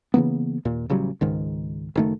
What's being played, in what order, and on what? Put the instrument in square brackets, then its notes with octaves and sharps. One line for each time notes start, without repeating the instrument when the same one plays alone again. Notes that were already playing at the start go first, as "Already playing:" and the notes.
[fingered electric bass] C#3 E3 A#3 B3
D#2 A#2
A1 C#3 F#3 G3
C#2 G#2 D#3
F#1 D#3 A3